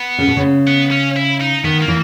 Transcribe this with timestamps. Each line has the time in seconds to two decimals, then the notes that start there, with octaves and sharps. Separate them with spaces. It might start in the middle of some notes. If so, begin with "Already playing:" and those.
Already playing: B3
0.18 C#3
0.28 B2
0.36 C#3
0.67 B3
0.91 C#4
1.16 E4
1.41 D#4
1.64 D#3 B3
1.81 A#3
1.88 E3